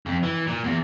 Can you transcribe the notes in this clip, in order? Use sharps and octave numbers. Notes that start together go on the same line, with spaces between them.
F2
E3
A#2
E2